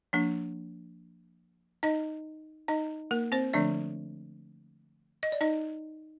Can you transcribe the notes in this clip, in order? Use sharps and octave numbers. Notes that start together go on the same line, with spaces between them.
F3 A#3 D4
D#4 D#5
D#4 D#5
A#3 A#4
C4 C5
D3 F3 A3 D4 D5
D#5
D5
D#4 D#5